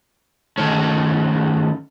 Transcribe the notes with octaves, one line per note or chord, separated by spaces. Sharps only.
D#3 F#3 A3 C#4